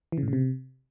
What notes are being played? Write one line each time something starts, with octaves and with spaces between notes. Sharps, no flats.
E3
C#3
A2
C#3
C3